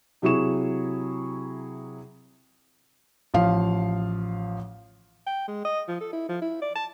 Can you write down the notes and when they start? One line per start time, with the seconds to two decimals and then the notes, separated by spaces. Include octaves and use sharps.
0.22 C3 F#3 E4 G#4 C#6 E7
3.34 A1 F3 F5
5.27 G5
5.48 G#3
5.65 D#5
5.88 F3
6.01 A4
6.13 E4
6.29 F3
6.42 E4
6.62 D5
6.75 A5